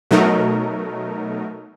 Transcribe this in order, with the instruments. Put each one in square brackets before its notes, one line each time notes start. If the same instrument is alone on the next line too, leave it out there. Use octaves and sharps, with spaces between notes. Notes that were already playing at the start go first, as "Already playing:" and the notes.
[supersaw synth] B2 F#3 A3 D#4 A#4